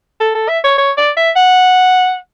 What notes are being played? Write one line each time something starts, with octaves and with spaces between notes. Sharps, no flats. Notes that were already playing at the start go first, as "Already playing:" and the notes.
A4
A4
E5
C#5
C#5
D5
E5
F#5